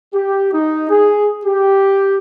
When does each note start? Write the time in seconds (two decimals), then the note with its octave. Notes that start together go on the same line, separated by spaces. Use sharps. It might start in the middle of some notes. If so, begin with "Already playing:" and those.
0.13 G4
0.53 D#4
0.90 G#4
1.45 G4